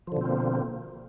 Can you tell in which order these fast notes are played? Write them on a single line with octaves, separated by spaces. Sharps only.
F3 D3 B2 C4 A#3